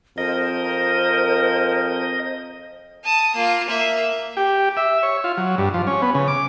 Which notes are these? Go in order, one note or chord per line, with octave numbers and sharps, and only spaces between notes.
F2 A#4 C5 D#5
A5 D#6
A#3 F4
A#3 E5
G4
E5
C#5
F4
F#3
G2
F3
C#4
B3
C#3
D6